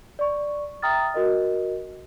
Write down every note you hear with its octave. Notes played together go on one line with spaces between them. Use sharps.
D5 C#6
E5 G5 A#5 D#6 F6 A6
F#4 A#4 D#5